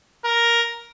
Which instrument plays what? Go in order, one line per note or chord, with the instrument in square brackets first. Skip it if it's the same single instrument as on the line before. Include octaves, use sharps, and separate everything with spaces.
[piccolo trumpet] A#4